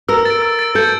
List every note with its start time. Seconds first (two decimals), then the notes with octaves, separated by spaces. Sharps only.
0.09 A#4 E6
0.25 A6 D7
0.42 E6
0.59 A6 D7
0.75 A4 G6